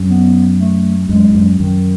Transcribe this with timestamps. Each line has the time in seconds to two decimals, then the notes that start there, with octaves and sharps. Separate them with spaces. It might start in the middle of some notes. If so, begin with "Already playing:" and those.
Already playing: F#2
0.09 B3
0.59 A3
1.09 F#2 G#3
1.29 G#2
1.35 F#2
1.60 F#2 D#3